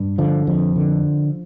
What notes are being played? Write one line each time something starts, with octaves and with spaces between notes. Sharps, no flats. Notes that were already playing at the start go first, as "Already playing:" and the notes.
Already playing: G2
D3 F3
F2 F3
D3